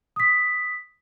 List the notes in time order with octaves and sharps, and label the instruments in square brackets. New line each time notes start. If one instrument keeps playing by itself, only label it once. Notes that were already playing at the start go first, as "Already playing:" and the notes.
[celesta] D#6 B6